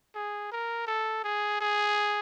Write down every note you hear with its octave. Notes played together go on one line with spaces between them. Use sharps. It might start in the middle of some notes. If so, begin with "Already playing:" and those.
G#4
A#4
A4
G#4
G#4